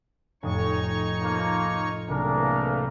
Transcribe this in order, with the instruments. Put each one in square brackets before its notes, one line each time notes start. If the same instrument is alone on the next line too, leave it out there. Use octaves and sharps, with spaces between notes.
[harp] F1 A2 D#6 [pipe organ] D#4 C#5 C#6
[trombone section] F3 A#3
[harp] C2 F#3 [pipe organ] E3 A3 A#3 [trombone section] D4 G#4 A#4